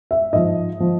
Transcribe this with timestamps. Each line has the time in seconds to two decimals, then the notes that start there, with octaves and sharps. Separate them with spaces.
0.11 E5
0.32 G#2 F3 D#5
0.80 F3